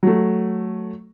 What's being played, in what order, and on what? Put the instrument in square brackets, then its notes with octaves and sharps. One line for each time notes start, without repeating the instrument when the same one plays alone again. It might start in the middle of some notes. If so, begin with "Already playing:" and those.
[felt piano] F#3 A3